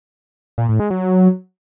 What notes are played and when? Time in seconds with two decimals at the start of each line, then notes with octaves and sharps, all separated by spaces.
0.58 A#2
0.69 A2
0.80 G#3
0.90 F#3